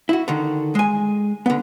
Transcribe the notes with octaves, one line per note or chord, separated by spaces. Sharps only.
E4 F#4
D3 D#3
G#3 G#5
D3 B3